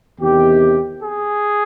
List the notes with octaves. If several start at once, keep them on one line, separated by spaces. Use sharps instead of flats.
E2 C3 D#3 G4
G#4